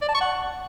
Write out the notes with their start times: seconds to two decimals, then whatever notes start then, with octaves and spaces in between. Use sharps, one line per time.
0.02 D5
0.08 A5
0.15 C#6
0.21 F#5